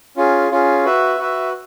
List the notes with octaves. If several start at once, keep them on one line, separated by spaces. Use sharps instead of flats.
C#4 F4 G#4
C#4 F4 G#4
F#4 B4 E5
F#4 B4 E5